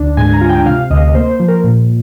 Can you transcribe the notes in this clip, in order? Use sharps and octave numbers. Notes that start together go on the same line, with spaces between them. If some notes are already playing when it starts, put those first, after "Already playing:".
Already playing: D2 D4
G#2 G#5
A#5
F4
G5
C3 F5
D2 D#5
A#3 C5
C5
F3
A#4
A#2